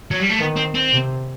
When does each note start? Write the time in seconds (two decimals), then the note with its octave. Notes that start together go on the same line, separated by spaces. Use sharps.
0.11 F#3
0.20 G3
0.30 A3
0.39 D#3 B3
0.57 C4
0.75 C4
0.93 C3